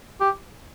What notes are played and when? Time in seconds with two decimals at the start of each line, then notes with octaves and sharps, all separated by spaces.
0.21 G4